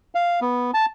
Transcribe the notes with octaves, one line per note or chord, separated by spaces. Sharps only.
F5
B3
A5